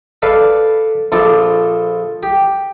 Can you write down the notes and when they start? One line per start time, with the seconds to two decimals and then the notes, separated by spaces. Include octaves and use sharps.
0.22 A4 B4 D5 F5
1.12 A#1 F3 A4 D6
2.23 G4